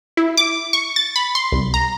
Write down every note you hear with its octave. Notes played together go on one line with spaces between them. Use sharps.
E4
D6
C#6
A6
B5
C6
C2
A#5